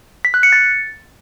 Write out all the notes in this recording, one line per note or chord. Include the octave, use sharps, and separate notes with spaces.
B6
F#6
C#7
A6